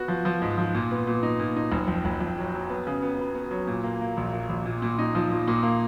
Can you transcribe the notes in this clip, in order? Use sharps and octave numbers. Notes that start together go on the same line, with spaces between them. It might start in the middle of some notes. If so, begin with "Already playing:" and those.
Already playing: B3 F#4
F3
F3
G#2
F3
A#2
B3
A#2
D#4
A#2
D#4
F#1
F2
F#1
F2
F#3
F#3
B3
C#3
B3
B3
B3
F#3
A#2
A#3
A#3
A#1
A#3
A#1
A#2
A#2
D#4
F3
A#2
A#2
A#3